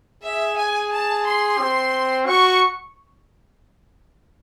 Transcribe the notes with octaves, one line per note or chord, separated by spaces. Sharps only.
G#4 E5
G#5
A5
C6
C4
F#4 C#6